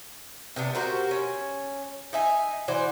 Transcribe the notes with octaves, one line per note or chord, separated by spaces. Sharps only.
C3 B3 D4
F#4 G4 A#4 C5
C#4
D#4 E5 G#5
E3 F#4 C5 D5